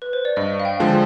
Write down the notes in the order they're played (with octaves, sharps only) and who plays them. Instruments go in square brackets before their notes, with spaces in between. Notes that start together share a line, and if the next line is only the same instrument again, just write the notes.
[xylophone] B4
C5
D5
[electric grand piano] G2 [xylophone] D#5
[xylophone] F5
G5
[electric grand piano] D3 F3 G#3